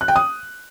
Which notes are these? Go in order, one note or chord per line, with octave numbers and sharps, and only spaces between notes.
F#6
G5
D#6